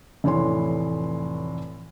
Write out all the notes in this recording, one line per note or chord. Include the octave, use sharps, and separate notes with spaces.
F1 A2 E3 C#5 C6